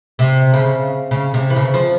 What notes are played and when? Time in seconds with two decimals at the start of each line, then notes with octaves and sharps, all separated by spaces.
0.19 C3
0.53 C#3
1.11 C#3
1.34 C3
1.50 E3
1.56 C#3
1.74 F3